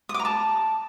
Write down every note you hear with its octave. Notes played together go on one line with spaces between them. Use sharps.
D#6
D6
A#5
A5